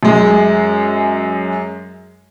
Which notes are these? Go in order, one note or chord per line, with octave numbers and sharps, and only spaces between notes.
F#2 G#3